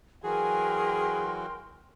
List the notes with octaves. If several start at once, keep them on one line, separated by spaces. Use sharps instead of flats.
E3 F#3 F#4 G#4 A#4 G5 G#5 C6